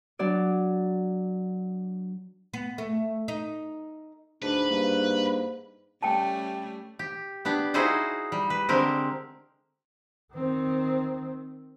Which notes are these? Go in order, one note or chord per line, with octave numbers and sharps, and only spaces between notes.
F#3 D4 F#4 D5
B3
A3
D#4
D2 G#2 D4 B4
G2 A#3
G3 A3 C#4 G5 A5
G4
B3 D4 G4
D#4 E4 F#4 G#4 C5 D#5
G3
B4
D3 G#3 C4 G4 A#4
D#3 C4